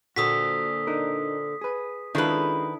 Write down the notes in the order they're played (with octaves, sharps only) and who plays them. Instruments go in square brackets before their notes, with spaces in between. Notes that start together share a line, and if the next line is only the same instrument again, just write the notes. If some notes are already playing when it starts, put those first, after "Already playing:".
[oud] A#2 D3 C4 [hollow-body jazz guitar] F#4 [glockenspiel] D#6 B6
[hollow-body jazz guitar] D4 D#4 A#4
G#4 B4
[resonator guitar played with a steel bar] D#3 B4 [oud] G#3 C#4 F4 [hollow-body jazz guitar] D4 E4 A4